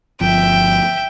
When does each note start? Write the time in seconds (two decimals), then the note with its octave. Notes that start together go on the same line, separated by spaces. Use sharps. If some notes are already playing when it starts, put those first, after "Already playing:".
0.21 G1 F3 E5 G5